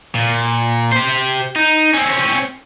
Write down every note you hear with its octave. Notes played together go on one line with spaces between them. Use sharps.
A#2
G4 C5
D#4
C4 C#4